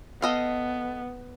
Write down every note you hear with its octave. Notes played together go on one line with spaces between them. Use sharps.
B3 A4 D#5 F5